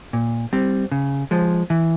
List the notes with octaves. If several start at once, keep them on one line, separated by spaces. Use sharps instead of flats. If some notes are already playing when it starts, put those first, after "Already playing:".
A#2
G3 C4
C#3
F3 G#3
E3